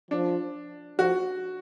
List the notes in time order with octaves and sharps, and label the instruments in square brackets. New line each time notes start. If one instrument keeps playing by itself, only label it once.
[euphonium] F3 [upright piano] D4
[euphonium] F3 [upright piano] F#4